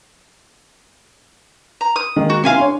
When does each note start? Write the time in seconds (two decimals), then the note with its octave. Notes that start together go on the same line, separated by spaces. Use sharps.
1.81 A#5
1.96 D#6
2.16 D#3 G#3 A#3
2.30 F#4
2.44 C3 E4 F5 G#5 C6
2.58 D4 C#5